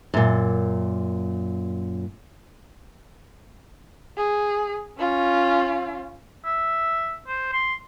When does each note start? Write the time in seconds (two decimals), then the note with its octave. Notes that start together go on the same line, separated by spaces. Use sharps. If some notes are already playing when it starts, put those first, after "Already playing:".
0.14 F#2 A#2
4.17 G#4
4.99 C#4 F4
6.45 E5
7.27 C5
7.52 C6